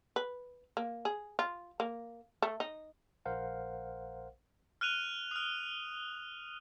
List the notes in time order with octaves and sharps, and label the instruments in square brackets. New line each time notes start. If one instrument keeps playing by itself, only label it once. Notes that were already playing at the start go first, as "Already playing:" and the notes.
[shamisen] B4
A#3
G#4
F4
A#3
A3
D#4
[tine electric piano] A#1 A#4 C5 F5 F#5
[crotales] F6 F#6 D#7 F7
D#6 F6